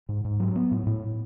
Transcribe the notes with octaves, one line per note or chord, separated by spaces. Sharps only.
G#2
G#2
F#3
B3
A2
A2